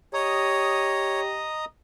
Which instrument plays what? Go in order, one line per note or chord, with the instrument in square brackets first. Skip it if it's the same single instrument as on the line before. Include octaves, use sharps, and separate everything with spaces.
[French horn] G4 [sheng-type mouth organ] C#5 [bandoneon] D#5 A#5 D#6